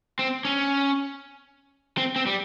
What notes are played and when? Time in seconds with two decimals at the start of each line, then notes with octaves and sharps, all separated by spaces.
0.19 C4
0.45 C#4
1.98 C4
2.16 C4
2.26 G3